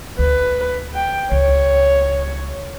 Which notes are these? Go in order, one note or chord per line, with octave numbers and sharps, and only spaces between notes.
D2 B4
G5
C#2 C#5